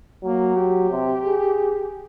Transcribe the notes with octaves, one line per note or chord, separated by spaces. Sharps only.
F#3 A#3
G4
C3
G#4